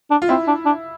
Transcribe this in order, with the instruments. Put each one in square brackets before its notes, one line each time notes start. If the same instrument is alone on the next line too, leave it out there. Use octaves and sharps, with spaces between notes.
[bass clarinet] D4
[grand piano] F4
[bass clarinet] C4 [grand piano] E4
[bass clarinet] D4
D4